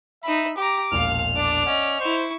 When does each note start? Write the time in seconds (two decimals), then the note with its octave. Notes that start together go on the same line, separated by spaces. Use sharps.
0.24 D#4 E5 B5
0.57 G4 A#5 D6
0.92 E1 A#1 F5 F6 F7
1.36 D4 D5
1.66 C#4 D#5 F#5
2.00 E4 C5 C#6